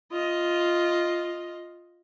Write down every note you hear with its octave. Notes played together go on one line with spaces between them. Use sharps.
F4 D#5